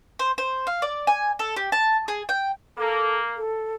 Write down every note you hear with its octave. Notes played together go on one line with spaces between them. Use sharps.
C5
C5
F5
D5
G#5
A4
G4
A5
G#4
G5
A#3 A4
A4